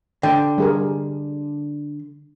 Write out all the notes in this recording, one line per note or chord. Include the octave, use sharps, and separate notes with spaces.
D3 G5
G3 G#4 A#4